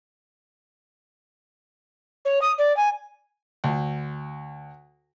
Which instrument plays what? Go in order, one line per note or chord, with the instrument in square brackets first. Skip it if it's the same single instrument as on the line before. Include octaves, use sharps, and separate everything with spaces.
[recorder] C#5
D#6
D5
G#5
[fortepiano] D2